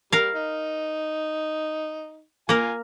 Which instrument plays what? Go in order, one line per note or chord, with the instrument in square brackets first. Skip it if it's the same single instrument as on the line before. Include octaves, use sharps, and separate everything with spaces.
[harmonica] G3 [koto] A#4 F5
[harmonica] D#4
[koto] A#3 A#4 [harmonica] F4 G#5